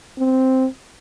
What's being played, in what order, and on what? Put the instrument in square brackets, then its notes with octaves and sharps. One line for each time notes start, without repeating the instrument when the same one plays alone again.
[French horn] C4